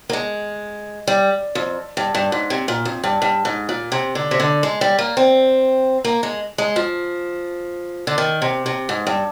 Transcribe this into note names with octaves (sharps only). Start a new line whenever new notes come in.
A#3
G#3
G3
F2
G2
G2
G#2
C3
A#2
F2
G2
G2
G#2
A#2
C3
D3
C3
D3
G#3
G3
A#3
C4
A#3
G#3
G#3
F3
D3
D#3
C3
C3
G#2
G2